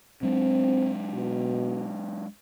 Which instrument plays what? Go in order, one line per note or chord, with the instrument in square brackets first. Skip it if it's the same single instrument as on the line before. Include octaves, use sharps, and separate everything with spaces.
[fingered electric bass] F#3 G#3 D4 [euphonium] C4
[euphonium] B2